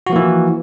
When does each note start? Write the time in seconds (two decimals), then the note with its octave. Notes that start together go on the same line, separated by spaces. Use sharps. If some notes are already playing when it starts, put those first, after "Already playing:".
0.07 F#4
0.10 F3
0.13 A#3
0.16 E3